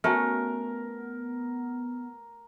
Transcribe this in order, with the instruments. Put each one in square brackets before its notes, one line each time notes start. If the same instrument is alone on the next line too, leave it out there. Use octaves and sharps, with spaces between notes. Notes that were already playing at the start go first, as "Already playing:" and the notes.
[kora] A3 C#4 F#4 [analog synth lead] B3 [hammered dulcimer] A#4